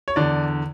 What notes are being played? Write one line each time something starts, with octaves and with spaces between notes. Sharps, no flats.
C#5
E2 D3 D5